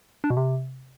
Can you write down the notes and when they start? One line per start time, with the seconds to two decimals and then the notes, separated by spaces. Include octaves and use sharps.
0.24 D4
0.30 B2
0.37 C3